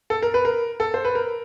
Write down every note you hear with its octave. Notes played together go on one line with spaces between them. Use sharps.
A4
A#4
B4
A#4
A4
C5
B4
A#4